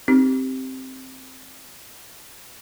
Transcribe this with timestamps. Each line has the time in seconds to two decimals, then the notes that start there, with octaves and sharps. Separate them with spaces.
0.08 C4 D#4 G4